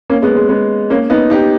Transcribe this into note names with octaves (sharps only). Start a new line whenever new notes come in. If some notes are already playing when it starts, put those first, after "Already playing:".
A#3 C#4
G#3 B3
G#3
G#3 B3
A#3 C#4
B3 D#4
D#4 G4